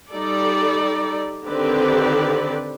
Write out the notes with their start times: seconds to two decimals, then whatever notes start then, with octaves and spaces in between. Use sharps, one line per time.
0.12 G3 D#4 A4 D5
1.47 D3 D#3 C4 G4 B4 D5